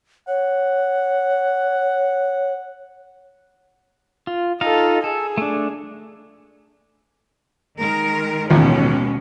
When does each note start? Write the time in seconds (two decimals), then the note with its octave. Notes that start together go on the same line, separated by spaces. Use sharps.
0.28 C#5 F#5
4.27 F4
4.61 D#4 F4 A4 D#5 F5
5.04 G#4 A4
5.38 A3 D4
7.77 D#3 G#3 A#4
8.50 A1 D#2 B2 F3 G#3 C#4